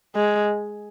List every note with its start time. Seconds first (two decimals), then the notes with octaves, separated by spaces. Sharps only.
0.15 G#3